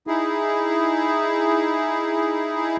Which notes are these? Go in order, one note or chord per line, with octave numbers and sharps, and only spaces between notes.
D#4 E4 G#4